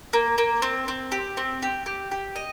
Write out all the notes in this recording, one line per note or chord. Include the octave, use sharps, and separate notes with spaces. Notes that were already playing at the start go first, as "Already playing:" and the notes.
A#3
A#3
C4
C4
G4
C4
G4
G4
G4
D#5